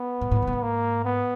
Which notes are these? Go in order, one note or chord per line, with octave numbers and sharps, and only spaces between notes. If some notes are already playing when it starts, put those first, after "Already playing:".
Already playing: B3
A2
A2
G#2
A2
G#2
A#3
B3